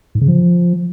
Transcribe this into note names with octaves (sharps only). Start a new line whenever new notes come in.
G#2
C#3
F3